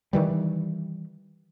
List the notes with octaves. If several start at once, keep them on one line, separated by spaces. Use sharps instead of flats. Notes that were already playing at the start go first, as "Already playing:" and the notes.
D#3 E3 G3